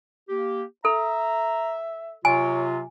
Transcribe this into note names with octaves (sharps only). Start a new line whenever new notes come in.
A#3 G4
A4 E5 A#5
C3 F#3 F4 C#5 G#5